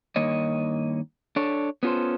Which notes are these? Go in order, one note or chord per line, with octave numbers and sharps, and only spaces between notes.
G2 D#3 A#3 C#5 D#5
D4 A4 C#5
B3 C#4 F4 F#4 A4 C5